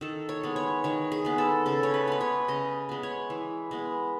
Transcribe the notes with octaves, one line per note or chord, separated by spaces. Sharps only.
D#3 A4
C#5
G#3 B3
C#5
D#3 C#5
G#4
G#3 B3
A4
C#3 A4
C#5
B4
G#3 B3 B4
C#5
C#3 D#5
G#3 B3
C#5
E3
G#3 B3